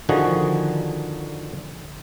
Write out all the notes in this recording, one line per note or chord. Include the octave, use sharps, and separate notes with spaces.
D3 D#3 F3 F#4 G#4